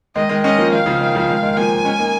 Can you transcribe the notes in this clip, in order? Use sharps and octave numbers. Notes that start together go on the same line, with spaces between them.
D#3 G#3 D#5
D#3 G#3
G#3 C#4 D#5
F3 A#3
D#3 F5
C#3 F3
D#3
C#3 F3
D#3 G#3
D#3 G#3
F3 A#3 G#5
G#3 C#4
A#3 D#4